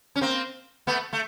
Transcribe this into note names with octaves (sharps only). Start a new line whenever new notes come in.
C#4
A#3 C4
A3 B3
A3